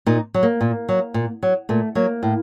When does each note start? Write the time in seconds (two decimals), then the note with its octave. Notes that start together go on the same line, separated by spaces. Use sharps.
0.06 A#2 D#4
0.34 F#3
0.43 A#3
0.61 A#2
0.89 F#3
1.14 A#2
1.43 F#3
1.69 A#2 A3
1.95 F#3 A#3
2.23 A2